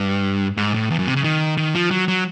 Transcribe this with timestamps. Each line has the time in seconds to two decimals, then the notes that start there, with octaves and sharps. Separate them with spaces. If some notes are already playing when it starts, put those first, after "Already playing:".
Already playing: G2
0.57 G#2
0.74 A2
0.91 E2
0.99 F#2
1.07 C3
1.16 C#3
1.24 D#3
1.57 D#3
1.75 F3
1.91 F#3
2.08 F#3